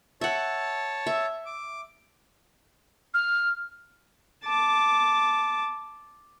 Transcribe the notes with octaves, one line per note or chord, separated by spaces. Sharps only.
C#5 E5 F#5 A5
E5
D6
F6
A5 D6